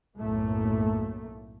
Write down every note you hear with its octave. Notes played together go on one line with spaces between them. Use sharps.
B1 F#2 A2 A3 A#3